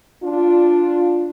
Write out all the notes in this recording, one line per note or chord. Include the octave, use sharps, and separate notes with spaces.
D4 F4